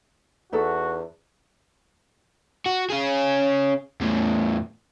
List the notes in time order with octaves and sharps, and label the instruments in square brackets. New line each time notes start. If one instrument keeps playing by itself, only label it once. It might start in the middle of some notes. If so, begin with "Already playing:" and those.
[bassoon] E2 [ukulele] D#4 E4 A4 [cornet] F#4
[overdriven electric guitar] F#4
C#4 G#4
E2 A2